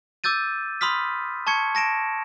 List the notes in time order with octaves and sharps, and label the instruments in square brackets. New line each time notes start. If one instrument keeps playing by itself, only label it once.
[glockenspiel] D6 E6 G6 A6 D#7
B5 C6 D#6 F6 B6
A5 C#6 G#6 C#7
A5 A#6 D7 E7